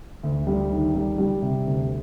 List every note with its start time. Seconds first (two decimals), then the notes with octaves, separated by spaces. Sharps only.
0.23 D2
0.47 G3
0.71 D#3
0.95 G3
1.18 G3
1.42 C3
1.65 D2